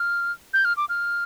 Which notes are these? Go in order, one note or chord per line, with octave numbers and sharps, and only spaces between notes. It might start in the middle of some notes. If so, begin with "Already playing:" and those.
Already playing: F6
G6
F6
D6
F6